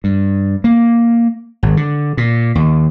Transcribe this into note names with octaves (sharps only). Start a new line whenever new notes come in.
G2
A#3
G#1
D3
A#2
D#2